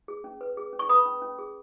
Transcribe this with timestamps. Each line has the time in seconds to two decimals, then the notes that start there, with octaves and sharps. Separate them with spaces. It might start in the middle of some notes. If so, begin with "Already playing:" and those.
0.08 G#4
0.24 C#4
0.41 B4
0.57 G#4
0.73 C#4
0.79 C#6
0.89 B4 B5 D#6
1.05 C#4
1.22 C#4
1.39 G#4